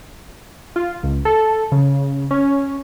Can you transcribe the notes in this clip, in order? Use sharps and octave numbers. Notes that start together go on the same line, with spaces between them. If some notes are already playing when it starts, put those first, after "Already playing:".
F4
C#2
A4
C#3
C#4